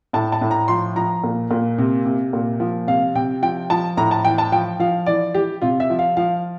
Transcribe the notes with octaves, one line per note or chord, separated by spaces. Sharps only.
A2 A5
A5
A2
A#5
F3 C6
F3 A#5
A#2
A#2
C3
C3
A#2
F3
C3 F5
C3 G5
F3 G5
F3 A5
A2 A#5
A5
E3 G5
A5
F3 G5
F3 F5
E3 D5
E3 G4
C3 F4
E5
F3
F5
F3 F5